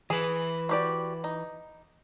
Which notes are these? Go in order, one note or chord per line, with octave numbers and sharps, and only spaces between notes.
E3 G#4 B4
F#4 G4 D5
D#4